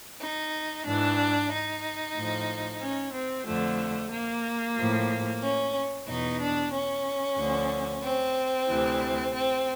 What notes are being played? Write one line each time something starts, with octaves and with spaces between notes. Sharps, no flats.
D#4
G#2 E3 D4
D#4
A2 F3
C#4
C4
F2 D3 F3 A3
A#3
A2 F3
C#4
E2 B2 D#4
D4
C#4
D2 D3 F3
C4
D2 C3 E3
C4